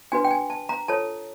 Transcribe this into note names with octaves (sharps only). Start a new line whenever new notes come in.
D4 F#4 B4 G#5
G5
G#5
A5
A#5
F4 A4 C#5 A5